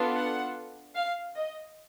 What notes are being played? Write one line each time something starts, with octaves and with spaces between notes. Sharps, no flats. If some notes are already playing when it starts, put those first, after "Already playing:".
Already playing: B3 D4 F4 A4
F#5
F5
D#5